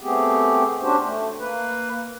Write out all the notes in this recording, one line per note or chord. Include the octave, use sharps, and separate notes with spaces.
A3 B3 C4 G4 G#4
C#4 D4 F#4 G4 C5
A3
A#3 B4